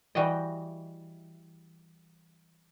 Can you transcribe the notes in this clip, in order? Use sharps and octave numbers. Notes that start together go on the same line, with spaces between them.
E3 G3 F#4 G4 D#5